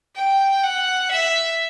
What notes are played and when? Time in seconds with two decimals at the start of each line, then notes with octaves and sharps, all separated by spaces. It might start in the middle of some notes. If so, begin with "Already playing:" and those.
0.16 G5
0.63 F#5
1.11 E5